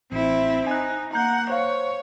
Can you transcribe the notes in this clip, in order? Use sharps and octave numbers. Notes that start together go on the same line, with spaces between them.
A1 C4 E4
D#4 G#5 F#6
A#3 F#5 A#5 G6
C5 C#5 F5